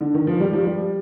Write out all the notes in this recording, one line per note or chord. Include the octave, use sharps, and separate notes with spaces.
D3
D#3
F3
G3
F3
G3